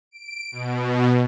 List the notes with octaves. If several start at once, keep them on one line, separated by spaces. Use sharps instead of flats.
D7
B2